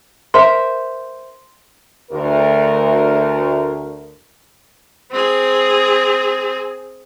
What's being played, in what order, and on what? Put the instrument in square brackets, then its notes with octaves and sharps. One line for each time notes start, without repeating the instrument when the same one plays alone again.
[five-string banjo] A#4 C5 E5 [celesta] C6
[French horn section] D2 A#4
[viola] C4 G#4